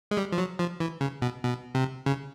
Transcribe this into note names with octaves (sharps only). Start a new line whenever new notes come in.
G#3
G3
F3
F#3
F3
E3
C#3
B2
B2
C3
C#3